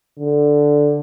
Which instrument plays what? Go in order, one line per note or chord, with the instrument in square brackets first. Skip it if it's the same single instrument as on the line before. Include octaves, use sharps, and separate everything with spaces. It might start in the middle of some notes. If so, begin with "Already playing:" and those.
[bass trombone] D3